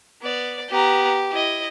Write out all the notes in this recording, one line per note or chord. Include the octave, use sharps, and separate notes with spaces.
B3 D5
B3 G4 A#5
E4 D#5